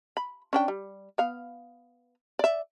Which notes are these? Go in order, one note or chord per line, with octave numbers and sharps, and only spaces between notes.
B5
C#4 D4 G5
G3
B3 F5
D5 E5